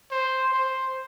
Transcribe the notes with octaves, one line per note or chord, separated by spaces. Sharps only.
C5
C5